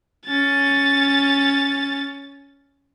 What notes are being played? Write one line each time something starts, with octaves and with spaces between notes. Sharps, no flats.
C#4 A6